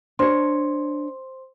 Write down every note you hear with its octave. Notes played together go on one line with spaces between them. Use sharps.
D4 C5 C#5 C6